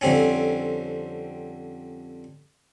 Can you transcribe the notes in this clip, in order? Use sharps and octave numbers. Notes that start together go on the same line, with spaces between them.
F2 D3 G3 C4 C#4